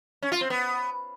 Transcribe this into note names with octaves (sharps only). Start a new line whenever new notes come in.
C#4
F4
C4
B3